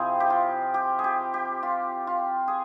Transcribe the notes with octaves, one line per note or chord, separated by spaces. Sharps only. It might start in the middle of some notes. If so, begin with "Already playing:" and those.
Already playing: C3 F3 C4 E4 G#4
G4
F4
G4
G#4
G4
G4
F4
F4
G#4